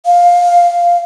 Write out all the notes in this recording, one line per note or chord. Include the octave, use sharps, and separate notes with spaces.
F5